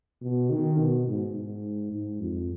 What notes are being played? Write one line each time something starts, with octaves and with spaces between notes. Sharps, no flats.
B2
D#3
B2
G#2
G#2
G#2
F2